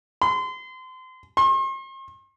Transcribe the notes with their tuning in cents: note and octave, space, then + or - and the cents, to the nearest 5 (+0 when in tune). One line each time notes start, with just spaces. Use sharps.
C6 -30
C6 +45